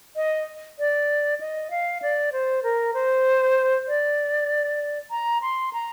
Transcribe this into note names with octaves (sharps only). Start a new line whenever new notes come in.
D#5
D5
D#5
F5
D5
C5
A#4
C5
D5
A#5
C6
A#5